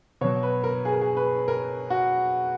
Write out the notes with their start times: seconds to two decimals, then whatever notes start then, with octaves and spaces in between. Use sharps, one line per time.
0.21 B2 F#3 C#5
0.43 B4
0.64 A#4
0.85 G#4
0.93 A#4
1.02 G#4
1.17 B4
1.48 A#4
1.90 F#4